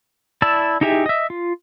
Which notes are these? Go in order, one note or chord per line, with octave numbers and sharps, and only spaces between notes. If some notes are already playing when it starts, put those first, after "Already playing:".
E4 D5 A5 E6
D#4 E4 G4 G#4 E5
D#5 E5
F4